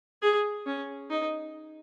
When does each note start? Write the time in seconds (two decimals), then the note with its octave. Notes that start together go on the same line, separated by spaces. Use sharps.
0.22 G#4
0.66 C#4
1.10 D#4